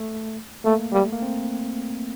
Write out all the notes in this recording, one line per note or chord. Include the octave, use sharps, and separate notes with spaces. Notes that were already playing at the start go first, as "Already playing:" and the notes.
Already playing: A3
A3 A#3
A3
G3 A#3
A3
A#3
C4